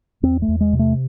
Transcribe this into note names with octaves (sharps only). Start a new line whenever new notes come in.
E2 C4
A3
E2
G#3
C3
A3